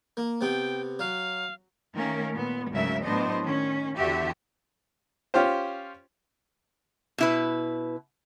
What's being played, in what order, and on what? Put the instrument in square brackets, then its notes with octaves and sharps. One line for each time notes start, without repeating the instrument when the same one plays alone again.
[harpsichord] A#3
[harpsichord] C3 B3 [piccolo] G5
[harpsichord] F#3 [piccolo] F5
[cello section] D#3 A3 A#3 C#4 A#4
A#2 B3
D2 G#2 C#3 F#3 A#4 E5
A2 F#3 B3 D4 C5 D#5
D#3 C#4
E2 D3 F#4 G4 E5
[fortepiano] C#4 F4 G4 C5
[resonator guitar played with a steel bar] B2 E4 B4